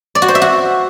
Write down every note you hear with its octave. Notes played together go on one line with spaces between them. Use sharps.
D5
F#4
C5
E5
F#4